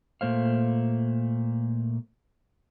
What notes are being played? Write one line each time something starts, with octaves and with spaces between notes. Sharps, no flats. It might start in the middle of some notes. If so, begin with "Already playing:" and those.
A#2 A3 C5 F5